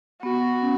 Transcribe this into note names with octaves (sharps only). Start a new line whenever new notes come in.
B3 F#4
C#4